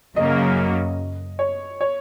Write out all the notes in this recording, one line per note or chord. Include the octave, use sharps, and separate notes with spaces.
F#2 C#3 F#3 A#3 D#5
C#5
C#5